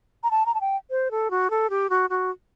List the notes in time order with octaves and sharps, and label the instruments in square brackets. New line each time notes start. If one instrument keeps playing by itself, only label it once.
[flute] A#5
A5
A#5
A5
G5
C5
A4
F#4
A4
G4
F#4
F#4